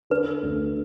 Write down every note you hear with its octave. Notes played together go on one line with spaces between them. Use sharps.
D3 B4
D2